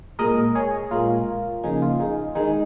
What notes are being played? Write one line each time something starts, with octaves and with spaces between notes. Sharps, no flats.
A#2 G#3 A#4 D#5
G#4 C#5
A#2 G#3 F4 A#4
C#3 F3 A#3 D#4 G#4
F4
D#4 G#4
D#3 G#3 D#4 G#4